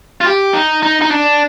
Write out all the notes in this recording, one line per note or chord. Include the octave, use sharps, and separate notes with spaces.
F4
G4
D#4
D#4
D#4
D4